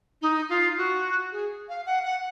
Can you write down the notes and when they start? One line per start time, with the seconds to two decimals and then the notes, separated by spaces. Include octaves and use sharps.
0.22 D#4
0.50 F4
0.78 F#4
1.32 G#4
1.69 F5
1.86 F#5
2.05 F#5